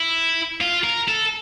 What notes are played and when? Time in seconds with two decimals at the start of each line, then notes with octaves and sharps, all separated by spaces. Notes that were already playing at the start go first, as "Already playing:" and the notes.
Already playing: E4
0.61 F4
0.84 A#4
1.08 A4